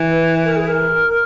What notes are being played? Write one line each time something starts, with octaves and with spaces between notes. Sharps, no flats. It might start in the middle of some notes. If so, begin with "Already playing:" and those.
Already playing: E3
B4
A#4
G#4
A#4